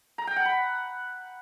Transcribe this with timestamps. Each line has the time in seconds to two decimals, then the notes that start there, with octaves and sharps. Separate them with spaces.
0.18 A#5
0.27 G5
0.36 F#5
0.45 B5